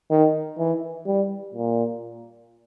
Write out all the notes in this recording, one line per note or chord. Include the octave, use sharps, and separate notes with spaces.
D#3
E3
G3
A#2